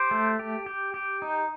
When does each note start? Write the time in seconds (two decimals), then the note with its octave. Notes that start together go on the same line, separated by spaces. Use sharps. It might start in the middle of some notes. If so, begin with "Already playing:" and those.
Already playing: G4 C5
0.11 A3
0.39 G4
0.66 G4
0.94 G4
1.22 D#4